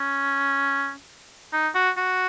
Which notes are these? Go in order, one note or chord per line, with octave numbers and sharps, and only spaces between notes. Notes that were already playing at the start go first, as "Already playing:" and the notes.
Already playing: C#4
D#4
F#4
F#4